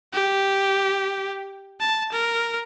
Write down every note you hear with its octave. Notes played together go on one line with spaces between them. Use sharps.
G4
A5
A#4